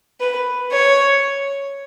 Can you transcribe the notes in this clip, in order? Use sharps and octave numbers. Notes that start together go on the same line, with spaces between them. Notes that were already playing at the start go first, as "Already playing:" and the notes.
B4
C#5